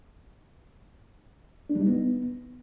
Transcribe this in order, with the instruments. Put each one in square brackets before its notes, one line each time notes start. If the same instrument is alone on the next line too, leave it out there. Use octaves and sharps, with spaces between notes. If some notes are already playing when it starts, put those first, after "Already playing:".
[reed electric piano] D4
G3
D#4
B3